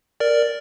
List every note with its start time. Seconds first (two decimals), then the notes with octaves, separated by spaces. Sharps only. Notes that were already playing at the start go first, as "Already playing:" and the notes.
0.20 A#4 D5